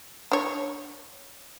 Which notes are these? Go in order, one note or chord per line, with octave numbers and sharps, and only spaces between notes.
D4 C#5